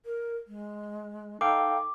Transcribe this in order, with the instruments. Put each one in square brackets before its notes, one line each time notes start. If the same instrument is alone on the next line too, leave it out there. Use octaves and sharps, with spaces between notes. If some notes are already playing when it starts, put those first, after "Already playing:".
[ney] A#4
G#3
[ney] D#4 [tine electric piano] A4 F5 G5 [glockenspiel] D6